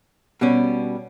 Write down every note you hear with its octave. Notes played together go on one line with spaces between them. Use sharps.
B2 G3 C#4